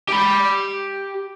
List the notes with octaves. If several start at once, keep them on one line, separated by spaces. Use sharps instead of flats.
G4 B5